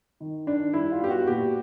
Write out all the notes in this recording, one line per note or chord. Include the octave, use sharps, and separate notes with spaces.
D#3
D#3 D4
G3 E4
F4
B3 G4
F#4
A#2 G4